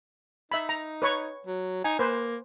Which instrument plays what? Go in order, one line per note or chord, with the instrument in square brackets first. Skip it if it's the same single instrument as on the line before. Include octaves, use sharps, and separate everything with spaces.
[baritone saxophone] D#4 [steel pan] E5 B5
[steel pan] A#5
B4 C#5 C#6
[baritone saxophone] F#3
[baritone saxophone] D#4 [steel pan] G#5
[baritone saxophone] A#3 [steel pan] B4 C5